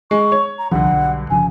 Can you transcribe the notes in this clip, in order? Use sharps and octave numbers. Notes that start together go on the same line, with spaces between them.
G#3 C#6
C#5
A#5
C2 G2 D3 F3 F#5
B1
G1 C#3 F3 G#5